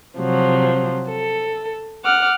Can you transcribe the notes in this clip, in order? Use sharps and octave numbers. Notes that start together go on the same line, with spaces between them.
C3 F3 F#3
A4
F#5 D6 F6